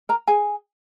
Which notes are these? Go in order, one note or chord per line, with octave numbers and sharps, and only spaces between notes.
A#4 A#5
G#4 G#5